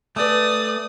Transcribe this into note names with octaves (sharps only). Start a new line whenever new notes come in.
A3 B4 D5 G#5 D#6